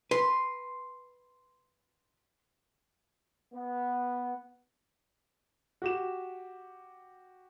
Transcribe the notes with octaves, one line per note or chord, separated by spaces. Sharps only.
B4 C6
B3
F#4 G4 E7